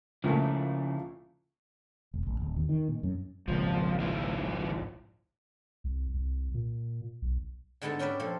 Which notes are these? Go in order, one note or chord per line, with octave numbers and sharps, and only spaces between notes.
C#2 A#2 C#3 F3 A3 E4
E1
A1
D1
D#2
D#3
A#2
F#2
G#1 C#2 A#2 F3
F3 E4 F4
C2
C2
A#2
B1
G#2 D3 G#3 B3 A4 A5
C#4 G4 A#4 B4 D5 E5
A#2 F3 A4 C5